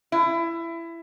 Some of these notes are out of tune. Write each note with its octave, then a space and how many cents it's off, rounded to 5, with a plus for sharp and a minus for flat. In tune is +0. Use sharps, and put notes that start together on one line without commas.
E4 +20